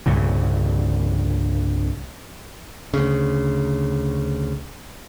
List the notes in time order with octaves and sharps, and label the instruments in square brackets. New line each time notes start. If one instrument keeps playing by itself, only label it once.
[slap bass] C2 G2 A#2 C#3
[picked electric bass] D2 C#3